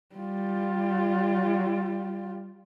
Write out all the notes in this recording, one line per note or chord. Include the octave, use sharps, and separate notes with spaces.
G3 F4